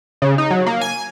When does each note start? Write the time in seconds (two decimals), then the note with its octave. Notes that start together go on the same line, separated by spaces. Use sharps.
0.22 C#3
0.38 D#4
0.51 F#3
0.66 A#3
0.81 G#5